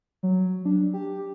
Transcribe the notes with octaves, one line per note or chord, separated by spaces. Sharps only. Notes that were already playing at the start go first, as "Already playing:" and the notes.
F#3
D4
G4